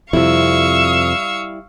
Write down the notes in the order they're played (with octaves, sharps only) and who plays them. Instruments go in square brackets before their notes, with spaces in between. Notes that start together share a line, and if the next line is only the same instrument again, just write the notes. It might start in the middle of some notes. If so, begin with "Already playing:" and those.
[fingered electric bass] F2 C3 [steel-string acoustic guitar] G3 E4 [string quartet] F5 C#6 E6